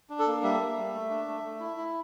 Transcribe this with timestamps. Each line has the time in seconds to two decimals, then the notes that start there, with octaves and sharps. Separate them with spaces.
0.10 D4
0.19 A4
0.27 A#3
0.43 G3 E5
0.60 A#3
0.77 G3
0.94 A3
1.10 D4
1.28 A3
1.43 A3
1.60 E4
1.77 E4